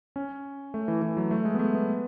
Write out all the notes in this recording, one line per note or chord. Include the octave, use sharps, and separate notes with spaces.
C#4
A3
E3
E3
F#3
A3
G#3
B3
A3
B3